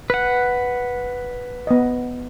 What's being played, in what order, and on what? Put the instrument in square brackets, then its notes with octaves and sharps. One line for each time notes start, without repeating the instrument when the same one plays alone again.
[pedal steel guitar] B4 F#5
[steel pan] B3 D#5